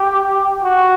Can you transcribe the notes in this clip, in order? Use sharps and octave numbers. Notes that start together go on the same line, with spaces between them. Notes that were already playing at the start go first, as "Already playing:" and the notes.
Already playing: G4
F#4